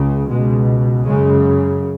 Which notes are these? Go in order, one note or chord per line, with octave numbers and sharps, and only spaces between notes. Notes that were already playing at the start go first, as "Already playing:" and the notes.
Already playing: C#2 C#3
C#2 B2 G#3
F#2 C#3 G#3